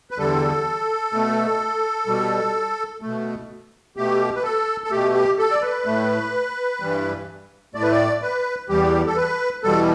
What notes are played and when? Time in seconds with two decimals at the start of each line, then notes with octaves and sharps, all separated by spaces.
0.11 B4
0.18 E2 D3 G3 A4
1.13 B2 A3
2.07 B2 G3
3.02 B2 A3
3.97 B2 A3 G4
4.36 B4
4.43 A4
4.84 A4
4.91 B2 A3 G4
5.14 G4
5.38 A4
5.51 D5
5.62 B4
5.86 A2 A3
6.80 G2 E3 G3
7.75 A2 A3 D5
7.83 B4
7.91 D5
8.22 B4
8.69 E2 E3 G3 G4
9.06 A4
9.16 B4
9.63 E2 B2 G3 A4